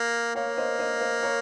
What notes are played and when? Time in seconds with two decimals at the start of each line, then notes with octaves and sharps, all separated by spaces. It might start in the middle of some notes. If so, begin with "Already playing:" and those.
Already playing: A#3
0.35 A#3 C#5 F5
0.57 C5 D#5
0.79 C5 D#5
1.01 C5 D#5
1.23 A#4 C#5